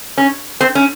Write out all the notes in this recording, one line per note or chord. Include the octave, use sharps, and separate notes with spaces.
C#4
C4
C#4